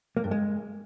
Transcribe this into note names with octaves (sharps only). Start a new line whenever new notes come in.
A#3
G2
G#3